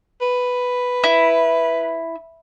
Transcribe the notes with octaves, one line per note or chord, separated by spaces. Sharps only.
B4
E4